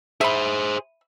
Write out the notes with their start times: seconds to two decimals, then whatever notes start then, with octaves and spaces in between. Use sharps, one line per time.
0.21 G#4 C5 E5 B5